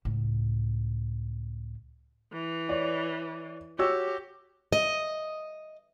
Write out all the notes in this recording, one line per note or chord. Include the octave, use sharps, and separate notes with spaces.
C#2 A2
E3
C#5 D5
F#4 G4 C#5 E6
D#5